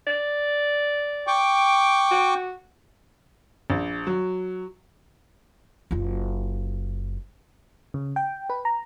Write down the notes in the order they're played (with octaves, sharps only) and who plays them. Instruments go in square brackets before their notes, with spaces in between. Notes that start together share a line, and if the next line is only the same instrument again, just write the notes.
[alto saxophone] D5
[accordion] G5 C#6 D6
[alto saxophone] F#4
[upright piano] A#1
F#3
[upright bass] F#1 F4
[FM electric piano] C#3
G5
B4
A#5